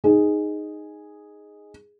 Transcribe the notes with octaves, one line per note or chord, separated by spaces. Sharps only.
D#4 G#4